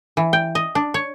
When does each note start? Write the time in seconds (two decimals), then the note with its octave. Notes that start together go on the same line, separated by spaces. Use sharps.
0.17 E3
0.33 G5
0.55 D#5
0.75 D4
0.94 C#5